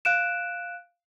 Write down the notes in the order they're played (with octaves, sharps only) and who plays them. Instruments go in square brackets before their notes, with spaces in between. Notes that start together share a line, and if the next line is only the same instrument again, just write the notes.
[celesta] F5 F#6 D7 E7